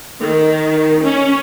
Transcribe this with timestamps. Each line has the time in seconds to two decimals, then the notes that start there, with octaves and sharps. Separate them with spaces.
0.21 D#3
1.02 C#4